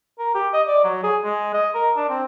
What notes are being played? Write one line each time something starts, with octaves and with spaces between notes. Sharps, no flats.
A#4
G4
D#5
D5
F#3
G#4
G#3
D#5
A#4
D4
C4